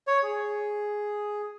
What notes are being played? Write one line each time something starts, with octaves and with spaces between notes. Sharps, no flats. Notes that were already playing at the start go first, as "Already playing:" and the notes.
C#5
G#4